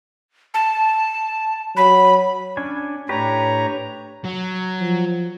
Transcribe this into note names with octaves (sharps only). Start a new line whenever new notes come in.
A5
F#3 B5
C#4 D4 G#5
A2 D4 G4 B4 C#5 A#5
F#3
F3